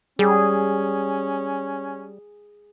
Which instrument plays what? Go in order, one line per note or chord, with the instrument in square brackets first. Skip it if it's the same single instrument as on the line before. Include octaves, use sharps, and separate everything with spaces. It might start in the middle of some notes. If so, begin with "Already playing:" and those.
[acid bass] G3 [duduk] C#4 [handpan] G#4